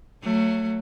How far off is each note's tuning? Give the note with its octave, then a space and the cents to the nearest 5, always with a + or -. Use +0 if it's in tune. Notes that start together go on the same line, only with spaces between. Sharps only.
F#3 +0 A3 +25